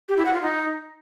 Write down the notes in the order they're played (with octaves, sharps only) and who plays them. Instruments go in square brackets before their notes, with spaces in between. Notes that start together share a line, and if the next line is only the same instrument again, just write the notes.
[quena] G4
E4
F#5
F4
D#4